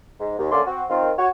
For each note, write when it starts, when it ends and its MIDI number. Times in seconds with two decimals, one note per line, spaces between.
0.20 0.36 44
0.39 0.50 39
0.52 0.61 50
0.52 0.61 57
0.52 0.61 58
0.52 0.61 61
0.52 0.61 74
0.52 0.61 84
0.67 0.84 60
0.67 0.84 66
0.89 1.12 51
0.89 1.12 60
0.89 1.12 65
1.18 1.28 66
1.18 1.28 73